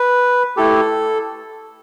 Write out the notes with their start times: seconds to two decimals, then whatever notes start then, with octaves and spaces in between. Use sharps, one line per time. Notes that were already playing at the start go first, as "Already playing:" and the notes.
Already playing: B4
0.57 A3 E4 G4 A4